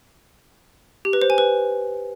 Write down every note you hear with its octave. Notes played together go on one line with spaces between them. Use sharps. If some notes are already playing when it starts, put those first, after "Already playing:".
G4
B4
C5
G#5
B4